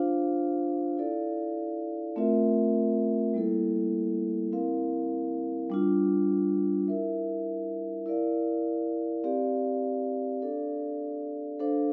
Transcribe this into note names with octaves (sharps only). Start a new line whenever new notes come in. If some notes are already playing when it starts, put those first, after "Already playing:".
Already playing: D4 F4 C5 F5
E4 A4 D5 F5
A3 C4 F4 A#4 E5
G3 A#3 E4 A4
C4 E4 A#4 F5
G3 D4 F4
E4 A#4 E5
E4 A#4 D5 F5
C4 G4 D5 F5
D4 A4 D5 F5
D4 A4 C5 F5